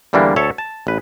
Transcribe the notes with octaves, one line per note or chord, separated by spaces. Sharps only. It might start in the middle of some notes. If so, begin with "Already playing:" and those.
E2 D3 E3 G3 A#3 D4
D2 A4 C#5 E5 A5
A5
A1 B4